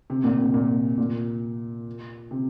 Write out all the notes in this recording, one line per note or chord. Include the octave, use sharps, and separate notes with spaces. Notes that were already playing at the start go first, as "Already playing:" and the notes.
C3
A#2
C3
A#2
A#2
C3